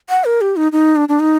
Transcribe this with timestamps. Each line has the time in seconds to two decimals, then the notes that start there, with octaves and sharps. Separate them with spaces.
0.10 F#5
0.25 A#4
0.41 G4
0.56 D#4
0.72 D#4
0.96 D4
1.09 D4
1.20 D#4